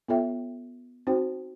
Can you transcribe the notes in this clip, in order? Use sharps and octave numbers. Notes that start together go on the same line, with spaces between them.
B3 F4 A4 C#5 E5 G5
C4 D#4 F#4 C5 G5